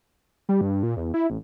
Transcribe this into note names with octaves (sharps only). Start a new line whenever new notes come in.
G3
G2
A#2
E2
E4
A1